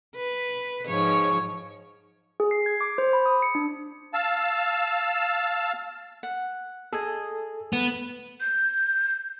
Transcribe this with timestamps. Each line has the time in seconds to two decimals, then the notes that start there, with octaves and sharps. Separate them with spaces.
0.16 B4
0.88 G#2 F3 C#5
2.40 G#4
2.51 C7
2.66 G#6
2.81 D6
2.98 C5
3.13 B5
3.26 D#6
3.42 C#7
3.55 D4
4.14 F5 A5 E6
6.23 F#5
6.93 G#4 A4 D#5 G#5
7.73 B3
8.40 G6